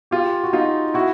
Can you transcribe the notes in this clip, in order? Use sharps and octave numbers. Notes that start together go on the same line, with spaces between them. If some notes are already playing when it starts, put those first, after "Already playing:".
F4 G4
F#4
D#4 F4
E4 F#4